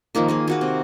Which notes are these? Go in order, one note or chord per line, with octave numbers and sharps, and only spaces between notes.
D#3 F3 A#3 D#4
A#3 D#4 G#4
A#3 F#4 B4
C3